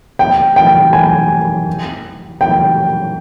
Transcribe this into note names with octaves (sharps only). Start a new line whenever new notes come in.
G5
G5
G#5
G5